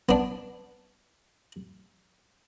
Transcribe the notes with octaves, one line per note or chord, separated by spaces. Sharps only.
B3 D4